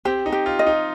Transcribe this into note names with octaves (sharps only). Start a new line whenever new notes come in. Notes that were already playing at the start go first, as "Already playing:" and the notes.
C4 G4
D#4
G4
F4
D#5
D#4